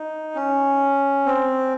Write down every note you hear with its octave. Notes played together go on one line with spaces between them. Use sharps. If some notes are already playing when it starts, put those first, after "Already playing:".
Already playing: D#4
C#4
C4